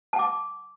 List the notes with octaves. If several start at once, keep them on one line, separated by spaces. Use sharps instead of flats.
F#5 A5 D6